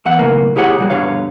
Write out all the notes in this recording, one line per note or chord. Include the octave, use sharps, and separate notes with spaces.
E2 E5 F#5
B1 A2 C#3 A#3
B2 E4 G4 G#4 C#5 F#5
A#2 G3 F#4
G2 B2 D3 C#5 F5